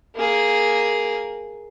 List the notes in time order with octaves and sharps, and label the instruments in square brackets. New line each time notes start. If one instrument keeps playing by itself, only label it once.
[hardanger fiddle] A#3 G#4